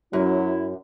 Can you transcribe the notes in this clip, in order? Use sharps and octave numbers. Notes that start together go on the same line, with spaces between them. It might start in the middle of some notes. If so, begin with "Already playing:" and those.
F#2 F#3 E4